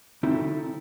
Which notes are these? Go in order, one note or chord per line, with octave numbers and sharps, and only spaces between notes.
D3 C4 D#4 E4 F#4 A4